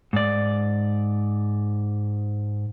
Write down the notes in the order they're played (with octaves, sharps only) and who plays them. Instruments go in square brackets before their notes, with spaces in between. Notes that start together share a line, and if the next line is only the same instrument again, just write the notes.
[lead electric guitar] G#2 D5